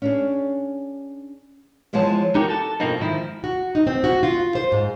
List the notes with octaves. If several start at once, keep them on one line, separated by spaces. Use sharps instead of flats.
C#4 D4 G#4
E3 F3 G#3 B3 C#5 A5
D#4 F#4 G4 A#4
A4 A5
G2 B2 F3 A#3 C4 D#4
G#2 D#3 F3 E4
F#4
D#4
C4
F#4
F4
C5
G#2